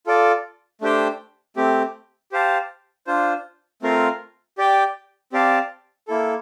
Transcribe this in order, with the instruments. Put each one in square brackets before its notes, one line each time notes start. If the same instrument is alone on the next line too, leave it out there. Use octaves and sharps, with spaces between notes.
[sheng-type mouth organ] F4 A4 D5
A3 D4 G4 C5 G5
A3 C4 G4
G4 C5 F5 A5
D4 F4 C5
A3 C4 F4 A#4 F5
G4 D5 G5
C4 G4 D5 F5 A5
A#3 E4 A4